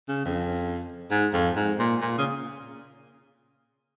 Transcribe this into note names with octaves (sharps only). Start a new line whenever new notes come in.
C#3
F2
G#2
F2
G#2
A#2
A#2
C#3